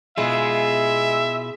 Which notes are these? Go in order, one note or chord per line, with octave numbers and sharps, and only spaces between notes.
B2 G#3 E4 F4 E5